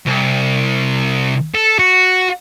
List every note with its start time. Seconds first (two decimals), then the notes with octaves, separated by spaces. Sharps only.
0.07 C2
1.55 A4
1.79 F#4